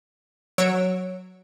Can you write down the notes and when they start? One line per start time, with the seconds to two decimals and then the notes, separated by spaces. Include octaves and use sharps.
0.58 F#3 C#5 E6 D7